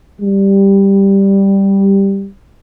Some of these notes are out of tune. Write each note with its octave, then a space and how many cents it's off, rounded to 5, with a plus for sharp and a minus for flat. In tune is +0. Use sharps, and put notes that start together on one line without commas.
G3 +5